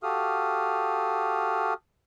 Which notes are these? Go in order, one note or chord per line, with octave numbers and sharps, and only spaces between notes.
F#4 G4 A4 F5 D#6 F6